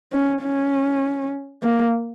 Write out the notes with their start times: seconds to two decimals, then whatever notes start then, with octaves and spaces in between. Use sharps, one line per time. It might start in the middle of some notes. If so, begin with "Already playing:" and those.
0.12 C#4
0.42 C#4
1.63 A#3